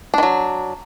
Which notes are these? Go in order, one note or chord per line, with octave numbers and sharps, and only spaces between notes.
D#3 F#3 D4